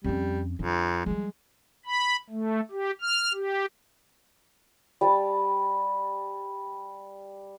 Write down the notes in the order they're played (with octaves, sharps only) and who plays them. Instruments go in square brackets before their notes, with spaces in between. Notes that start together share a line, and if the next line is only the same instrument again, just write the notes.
[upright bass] F2 C#4 [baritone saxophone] G3
[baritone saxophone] F2 [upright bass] D3 D4
[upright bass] F3 G3 [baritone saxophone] G#3
[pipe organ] B5
A3
G4
F6
G4
[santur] G3 A5